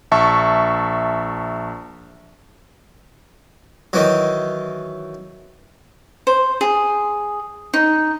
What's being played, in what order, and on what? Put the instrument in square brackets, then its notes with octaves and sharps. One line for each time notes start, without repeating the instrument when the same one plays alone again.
[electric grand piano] A#1 E5 A5 C#6
[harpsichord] D#3 E3 F#3
[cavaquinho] C5
G#4
D#4